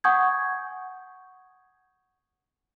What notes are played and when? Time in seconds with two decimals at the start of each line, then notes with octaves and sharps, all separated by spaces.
0.04 F#5 G#5 C#6 D#6 G6 G#6